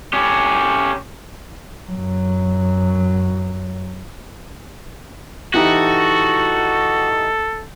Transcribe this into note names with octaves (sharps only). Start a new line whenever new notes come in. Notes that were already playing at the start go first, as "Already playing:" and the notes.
C#4 G4
F#2 F#3
E3 D#4 F#4 G4 A4